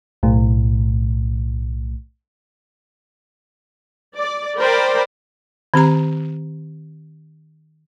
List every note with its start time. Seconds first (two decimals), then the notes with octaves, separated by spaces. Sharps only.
0.23 B1 A2
4.17 D5
4.58 A#4 C5 D5 G5 B5
5.74 D#3 C4 G4 A#5